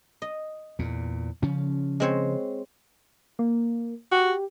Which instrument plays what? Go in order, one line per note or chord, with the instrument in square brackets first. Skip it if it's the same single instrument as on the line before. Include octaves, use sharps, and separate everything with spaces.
[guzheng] D#5
[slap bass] E2 A#2
C#3 F3 C#4
[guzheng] G#3 C4 C#5
[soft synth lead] A#3
[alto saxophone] F#4 [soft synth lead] G4